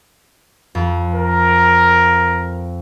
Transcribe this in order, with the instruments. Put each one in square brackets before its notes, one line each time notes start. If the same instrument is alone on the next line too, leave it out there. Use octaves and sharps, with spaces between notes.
[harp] F2
[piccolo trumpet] A#4